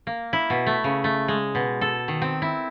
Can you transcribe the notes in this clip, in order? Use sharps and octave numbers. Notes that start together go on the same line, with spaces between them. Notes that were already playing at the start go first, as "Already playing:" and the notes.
A#3
E4
B2
A3
C#3
A3
G#3
B2
A4
D#3
C4
E4